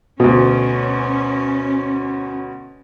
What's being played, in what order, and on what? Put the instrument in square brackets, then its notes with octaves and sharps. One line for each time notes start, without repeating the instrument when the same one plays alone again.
[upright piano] D2 B2 [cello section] C#4